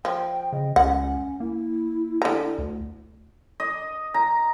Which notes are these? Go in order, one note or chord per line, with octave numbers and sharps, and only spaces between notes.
F3 G5
C#3 D#5
C#2 C#4 F#5
A#3 E4
D3 A#5
D2
D#5
A#5